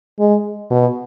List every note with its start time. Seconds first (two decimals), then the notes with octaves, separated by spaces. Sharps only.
0.19 G#3
0.71 B2